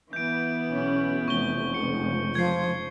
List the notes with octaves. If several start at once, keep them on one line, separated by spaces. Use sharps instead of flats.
E3 B3 G6 D7
B1 C#4
F1 C#6 G6 G7
C#2 C#7
F3 G#6 C7